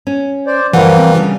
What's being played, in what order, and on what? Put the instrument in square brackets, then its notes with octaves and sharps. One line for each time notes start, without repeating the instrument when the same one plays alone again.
[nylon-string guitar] C#4
[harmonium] C5 D5
[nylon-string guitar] F#2 D3 F#5 [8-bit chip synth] E3 [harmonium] F3 G3 A#3
[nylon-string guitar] C4
C#3 G3 D4